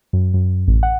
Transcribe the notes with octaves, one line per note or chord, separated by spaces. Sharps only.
F#2
F#2
A1
F#5